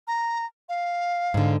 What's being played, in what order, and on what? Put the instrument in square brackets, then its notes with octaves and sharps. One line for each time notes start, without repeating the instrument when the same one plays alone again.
[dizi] A#5
F5
[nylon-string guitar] G#2 D3